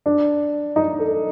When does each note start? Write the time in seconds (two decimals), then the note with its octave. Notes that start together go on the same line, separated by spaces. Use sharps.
0.06 D4
0.76 D#4
0.99 A4